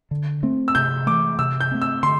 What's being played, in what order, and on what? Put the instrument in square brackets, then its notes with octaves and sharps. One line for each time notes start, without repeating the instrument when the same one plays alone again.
[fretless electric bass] D3
A3 C4
[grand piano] E6
[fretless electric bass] C3 [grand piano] G6
[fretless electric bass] E3 A3 [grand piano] D6
[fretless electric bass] C3 [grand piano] E6
[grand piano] G6
[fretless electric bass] A3 C4
[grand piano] E6
[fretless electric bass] D3 [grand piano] C6